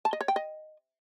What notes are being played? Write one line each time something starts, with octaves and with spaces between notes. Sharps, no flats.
A5
D#5
C#5
G5
D#5